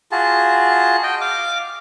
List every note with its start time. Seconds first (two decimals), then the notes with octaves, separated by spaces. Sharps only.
0.12 F4 F#4 G#4 A5
1.03 D#5 G5
1.21 F5 D6